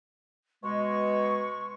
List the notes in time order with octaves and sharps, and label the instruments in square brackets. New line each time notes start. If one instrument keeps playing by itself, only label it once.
[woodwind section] B2 G#3 [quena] C#6